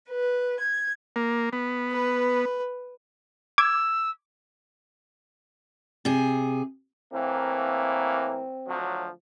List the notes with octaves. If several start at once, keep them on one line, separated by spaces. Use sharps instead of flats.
B4
G#6
A#3
B3
B4
D6 E6 G#6
C3 G#4
A2 E3 A#3 C4
D2 F3 F#3